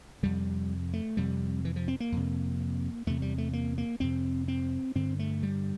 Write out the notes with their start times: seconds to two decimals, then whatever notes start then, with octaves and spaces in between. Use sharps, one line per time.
0.23 F2 C3 G3
0.94 A3
1.17 F2 C3 G3
1.65 E3
1.76 F3
1.88 C4
2.00 A#3
2.12 F2 C3
3.07 E2 C3 A3
3.22 G3
3.38 A3
3.53 A#3
3.78 A#3
4.00 F2 C3 C4
4.48 C4
4.95 G2 D3 C4
5.19 A3
5.43 G3